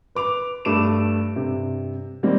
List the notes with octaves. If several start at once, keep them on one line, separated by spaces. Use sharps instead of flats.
B4 D6 F7
G2 A3 D6 D7 E7
G2 C3
D#3 G3 A#3 C4